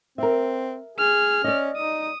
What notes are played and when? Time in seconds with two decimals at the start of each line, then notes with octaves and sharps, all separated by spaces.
0.18 C4 A#4 E5
0.98 G#4 F6
1.44 C#4 D5 D#5
1.76 D#4 D#6